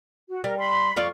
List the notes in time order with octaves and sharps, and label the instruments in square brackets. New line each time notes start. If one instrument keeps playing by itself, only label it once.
[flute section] F#4
[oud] G3 [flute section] A#4
[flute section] B5 C6
[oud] F2 F4 D5 [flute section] C#6